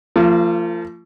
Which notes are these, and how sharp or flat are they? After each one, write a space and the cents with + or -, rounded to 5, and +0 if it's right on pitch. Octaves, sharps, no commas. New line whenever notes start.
F3 -25 A3 +40